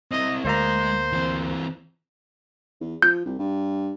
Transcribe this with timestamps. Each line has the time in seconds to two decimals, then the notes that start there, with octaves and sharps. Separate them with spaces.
0.11 C4 E4 D#5
0.45 D2 G#3 A#3 C5 A#5
1.12 E3 C4
2.81 E2
3.02 F3 G6
3.26 C2
3.39 G2